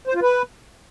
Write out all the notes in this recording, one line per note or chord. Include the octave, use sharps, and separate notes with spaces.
C5
F4
B4